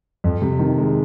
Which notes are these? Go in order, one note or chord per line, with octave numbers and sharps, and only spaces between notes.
F2
C3
D#3
G#3